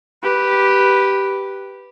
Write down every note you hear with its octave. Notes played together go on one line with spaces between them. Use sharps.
G4 B4